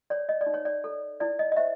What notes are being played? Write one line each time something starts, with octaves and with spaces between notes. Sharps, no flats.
C#5 D5
D#5
D5
D#4
C#5
D5
A4
E4 D5
D#5
D#5
C5 E5